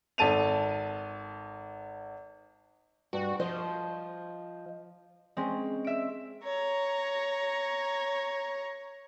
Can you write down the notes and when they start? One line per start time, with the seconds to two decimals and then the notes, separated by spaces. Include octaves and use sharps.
0.18 G#1 A4 A5 D#7 F7
3.13 G2 F#4
3.40 F3 C5 D#5
5.37 G#3 C4 C#4
5.84 E5 D7
6.43 C#5 A#5